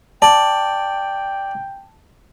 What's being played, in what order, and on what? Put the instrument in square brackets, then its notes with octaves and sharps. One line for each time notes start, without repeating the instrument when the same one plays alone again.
[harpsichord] D5 [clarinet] G5 [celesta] A5